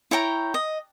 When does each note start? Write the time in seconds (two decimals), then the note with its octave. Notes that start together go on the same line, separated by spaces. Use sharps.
0.11 E4 C#5 G5 A#5
0.54 D#5